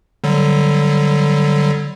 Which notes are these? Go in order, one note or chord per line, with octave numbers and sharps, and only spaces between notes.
D3 F#3 G3